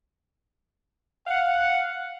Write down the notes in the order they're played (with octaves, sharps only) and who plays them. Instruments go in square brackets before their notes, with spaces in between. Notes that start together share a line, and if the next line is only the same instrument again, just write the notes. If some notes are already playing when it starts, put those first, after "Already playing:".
[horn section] F5 F#5